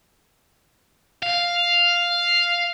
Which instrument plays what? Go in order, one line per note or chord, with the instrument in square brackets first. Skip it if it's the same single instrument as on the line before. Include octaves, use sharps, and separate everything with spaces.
[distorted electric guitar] F5